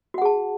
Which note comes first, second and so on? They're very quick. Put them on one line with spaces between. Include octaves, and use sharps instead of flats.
F#4 F#5 G#4 A5